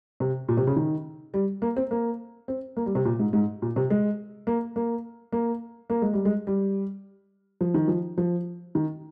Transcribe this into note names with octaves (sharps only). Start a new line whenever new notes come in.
C3
A#2
C3
C#3
D#3
G3
A#3
C4
A#3
C4
A#3
G3
C3
A#2
G#2
G#2
A#2
C3
G#3
A#3
A#3
A#3
A#3
G#3
G3
G#3
G3
F3
D#3
F3
F3
D#3